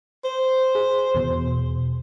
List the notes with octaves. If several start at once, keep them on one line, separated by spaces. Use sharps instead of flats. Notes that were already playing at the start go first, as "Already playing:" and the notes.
C5
G#4
E2 B2